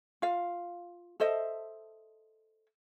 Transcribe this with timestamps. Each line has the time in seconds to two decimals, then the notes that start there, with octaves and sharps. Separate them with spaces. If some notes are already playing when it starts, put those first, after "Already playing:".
0.22 F4 F5
1.20 A4 C5 D#5 E5